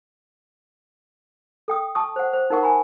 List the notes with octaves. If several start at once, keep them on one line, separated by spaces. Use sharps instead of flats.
A4 G5 D#6
A5 C#6 D#6
C5 F#5
C5
D#4 A#4 F#5 C#6
G#5 A#5 B5